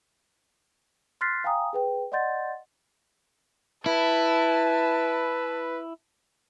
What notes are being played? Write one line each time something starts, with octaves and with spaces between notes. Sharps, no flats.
C6 F6 F#6 A6 B6 C7
F5 G5 G#5 A#5 D#6
G#4 B4 G5
D5 D#5 F#5 C6 G6 A6
E4 B4 A5